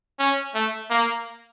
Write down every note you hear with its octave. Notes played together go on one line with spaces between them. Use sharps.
C#4
A3
A#3